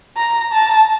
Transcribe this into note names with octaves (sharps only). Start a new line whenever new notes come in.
A#5
A5